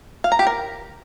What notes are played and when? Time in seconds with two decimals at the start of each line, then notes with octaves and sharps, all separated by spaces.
0.24 F5
0.32 A#5
0.39 G4
0.47 A#4